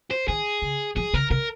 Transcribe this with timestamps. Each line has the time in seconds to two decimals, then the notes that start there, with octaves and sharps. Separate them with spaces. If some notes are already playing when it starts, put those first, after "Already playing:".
0.11 C5
0.28 D#3 G#4
0.62 C#3
0.96 F3 G#4
1.14 C#3 A#4
1.30 C3 A#4